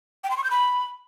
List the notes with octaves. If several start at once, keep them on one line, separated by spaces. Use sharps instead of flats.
G5
C6
C#6
G6
B5